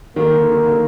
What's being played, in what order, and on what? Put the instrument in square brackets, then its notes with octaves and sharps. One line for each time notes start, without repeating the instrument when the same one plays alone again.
[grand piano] D#3 [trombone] A#3
[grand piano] D3
D#3
D3
D#3